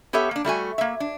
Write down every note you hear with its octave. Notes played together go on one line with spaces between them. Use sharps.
B3 G4 A4 C#5 E5
A#3 D4
G3 A3 F#4 G#5
A#3 E5
D4